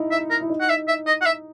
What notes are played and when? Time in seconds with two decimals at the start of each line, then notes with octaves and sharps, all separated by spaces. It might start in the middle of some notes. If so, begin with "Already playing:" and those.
Already playing: D#4 E4
0.11 E5
0.31 A#4
0.41 E4
0.50 D#4
0.61 F#5
0.70 E5
0.88 E5
1.07 D#5
1.21 F#5
1.26 E5